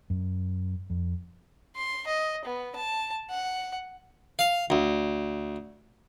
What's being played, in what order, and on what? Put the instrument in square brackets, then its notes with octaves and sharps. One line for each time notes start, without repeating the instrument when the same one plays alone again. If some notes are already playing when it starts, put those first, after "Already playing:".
[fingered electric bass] F#2
F2
[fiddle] C6
D#5
B3
A5
F#5
[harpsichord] F5
D2